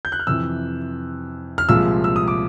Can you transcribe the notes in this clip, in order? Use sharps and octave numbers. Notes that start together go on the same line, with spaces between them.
G6
F#6
F6
F2 C3 E3 E6
F6
C2 A#2 F3 G#3 E6
E6
D#6
D6